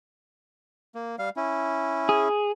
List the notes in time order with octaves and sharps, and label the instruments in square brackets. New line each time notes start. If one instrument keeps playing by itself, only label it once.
[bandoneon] A#3
G3 F5
C#4 E4
[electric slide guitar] G#4